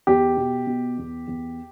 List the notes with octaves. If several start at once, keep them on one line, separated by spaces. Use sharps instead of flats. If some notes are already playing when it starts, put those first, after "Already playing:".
E2 G4
B2
B2
E2
E2